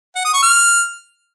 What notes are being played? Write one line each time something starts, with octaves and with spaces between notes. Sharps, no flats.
F#5
D#6
C#6
F6